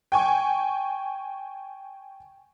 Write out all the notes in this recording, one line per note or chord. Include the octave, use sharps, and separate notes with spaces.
G5 G#5 C#6